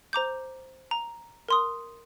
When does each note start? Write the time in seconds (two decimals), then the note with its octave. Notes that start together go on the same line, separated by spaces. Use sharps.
0.13 C5 A#5 D6 G6
0.91 A#5
1.49 A#4 C6 D#6